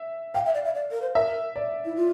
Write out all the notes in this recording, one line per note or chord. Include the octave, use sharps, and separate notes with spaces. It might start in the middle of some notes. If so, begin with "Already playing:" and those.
Already playing: E5
F5 G5
E5
D5
E5
D5
A#4
C5
A#4 E5
D5
E4
F4